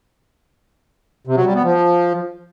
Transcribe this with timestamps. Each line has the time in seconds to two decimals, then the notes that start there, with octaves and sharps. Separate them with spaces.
1.27 C3
1.36 F#3
1.45 G3
1.54 B3
1.63 F3